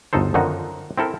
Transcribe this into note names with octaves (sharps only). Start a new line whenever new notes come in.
G1 D2 D#4 A4 C5
F#2 D3 D#3 F3 D#4 F#4
C4 E4 A4 A#4